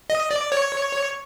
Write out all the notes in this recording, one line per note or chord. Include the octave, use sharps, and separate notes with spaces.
D#5
D5
C#5